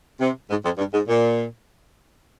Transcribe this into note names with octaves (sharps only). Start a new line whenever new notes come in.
C3
G#2
F2
G2
G#2
A#2